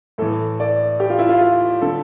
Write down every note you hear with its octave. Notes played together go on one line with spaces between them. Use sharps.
A2 E3 A4
D5
G4
F4
E4
F4
F4
D3 A4